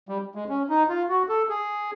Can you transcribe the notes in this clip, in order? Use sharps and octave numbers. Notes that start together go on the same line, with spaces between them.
G3
G#3
C#4
D#4
F4
F#4
A4
G#4